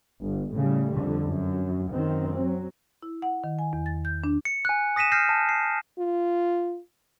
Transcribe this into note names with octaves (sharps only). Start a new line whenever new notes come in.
G1
A2 C#3 G3
F2 D3
F#2
F#2 D#3 C4
F#3
E4
F#5
D#3
G#5
E2
A6
G6
D4
C#7
G#5 F#6
D#6 A#6 B6 D#7 E7
F6 G6 A#6 C7 E7
A5
C7
F4